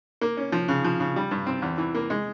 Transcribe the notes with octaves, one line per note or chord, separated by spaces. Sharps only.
A#3
C#4
F3
C#3
F3
C#3
G3
G2
C4
E2
E3
A#3
G#3